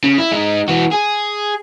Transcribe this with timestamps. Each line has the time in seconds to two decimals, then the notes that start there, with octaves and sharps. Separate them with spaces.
0.04 C#3
0.18 E4
0.32 G#3 D#4
0.68 E3 F#4
0.91 G#4